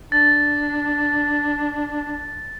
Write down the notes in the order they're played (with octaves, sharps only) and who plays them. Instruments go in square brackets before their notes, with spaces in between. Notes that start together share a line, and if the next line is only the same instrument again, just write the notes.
[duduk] D4 [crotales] A6